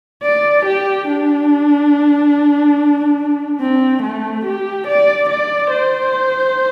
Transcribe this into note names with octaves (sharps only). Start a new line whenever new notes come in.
D5
G4
D4
C4
A3
G4
D5
D5
C5